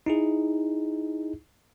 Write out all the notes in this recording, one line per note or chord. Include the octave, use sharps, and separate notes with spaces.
D#4 E4 G#4